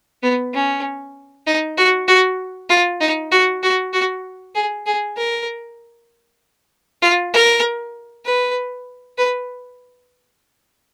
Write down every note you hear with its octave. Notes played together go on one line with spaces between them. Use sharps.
B3
C#4
D#4
F#4
F#4
F4
D#4
F#4
F#4
F#4
G#4
G#4
A#4
F4
A#4
B4
B4